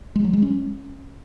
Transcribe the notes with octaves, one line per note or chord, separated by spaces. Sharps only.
G#3
F#3
G#3
C#4